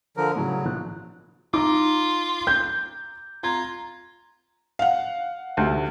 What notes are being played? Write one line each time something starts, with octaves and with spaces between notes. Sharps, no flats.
D3 F3 A#4
A2 C#3 F#3
A#1 F3 F#6
D#4 F4 A#5 D6
G6
F4 A#5 G#6
F5 F#5
D2 C3